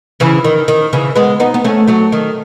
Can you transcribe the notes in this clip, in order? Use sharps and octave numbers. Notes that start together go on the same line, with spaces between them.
C#3 E3
D#3
D#3
C#3 E3
G#3 B3
B3 D#4
B3
A3 C#4
F#3 A3
D#3